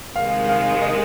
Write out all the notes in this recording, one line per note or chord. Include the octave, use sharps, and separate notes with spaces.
C3 D#3 G#3 F5
F5
D#5